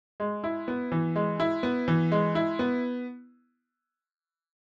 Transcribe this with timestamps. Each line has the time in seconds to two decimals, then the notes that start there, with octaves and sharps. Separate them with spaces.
0.20 G#3
0.44 E4
0.68 B3
0.92 E3
1.16 G#3
1.40 E4
1.63 B3
1.88 E3
2.12 G#3
2.35 E4
2.59 B3